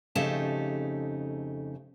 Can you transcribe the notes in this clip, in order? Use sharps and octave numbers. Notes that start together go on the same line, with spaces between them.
F2 C#3 A3 D#4 G4 A5